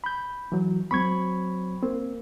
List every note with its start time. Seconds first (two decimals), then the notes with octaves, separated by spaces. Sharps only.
0.04 B5 G6
0.52 E3 F#3
0.91 F#3 C4 B5 C#6 G#6
1.83 A#3 C4